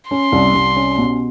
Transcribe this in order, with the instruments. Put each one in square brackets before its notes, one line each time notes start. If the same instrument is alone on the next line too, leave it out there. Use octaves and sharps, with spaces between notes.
[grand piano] C#4 [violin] C6
[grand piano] C2
C2
C#4
B2